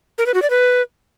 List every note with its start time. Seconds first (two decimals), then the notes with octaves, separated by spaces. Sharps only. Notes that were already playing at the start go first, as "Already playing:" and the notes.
0.18 A#4
0.26 B4
0.34 F#4
0.42 D5
0.50 B4